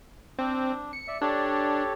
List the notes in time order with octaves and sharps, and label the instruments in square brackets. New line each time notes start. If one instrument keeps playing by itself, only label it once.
[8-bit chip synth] C4 [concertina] D4
[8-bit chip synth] C#7
[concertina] D5 E5
[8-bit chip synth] D4 [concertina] G4 A4 C#5